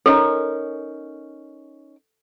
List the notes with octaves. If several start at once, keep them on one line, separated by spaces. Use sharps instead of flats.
C#4 D#4 A4 A#4